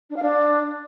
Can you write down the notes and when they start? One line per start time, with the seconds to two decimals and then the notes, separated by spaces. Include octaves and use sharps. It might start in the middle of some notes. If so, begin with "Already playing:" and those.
0.10 D4
0.16 F5
0.22 D4